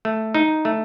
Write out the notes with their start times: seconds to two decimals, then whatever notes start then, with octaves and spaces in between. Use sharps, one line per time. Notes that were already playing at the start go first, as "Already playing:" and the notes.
0.05 A3
0.35 D#4
0.65 A3